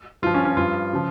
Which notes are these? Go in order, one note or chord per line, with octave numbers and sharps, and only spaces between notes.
G2 F3 F4
C#4
C#4
G2 F3 F4
C#3 F3